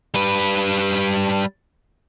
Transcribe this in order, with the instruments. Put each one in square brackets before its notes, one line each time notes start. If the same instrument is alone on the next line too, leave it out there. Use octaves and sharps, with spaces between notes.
[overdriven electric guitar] G3 B4